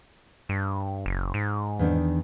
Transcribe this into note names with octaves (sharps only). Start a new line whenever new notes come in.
G2
F#1
G#2
E2 D#3 D4